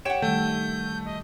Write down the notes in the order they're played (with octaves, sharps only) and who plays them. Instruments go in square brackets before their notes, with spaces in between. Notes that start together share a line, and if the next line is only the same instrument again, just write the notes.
[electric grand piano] G4 C#5 E7 [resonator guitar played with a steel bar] F#5 G5
[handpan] D#3 G3 [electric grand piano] A3 [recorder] G6
[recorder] D#5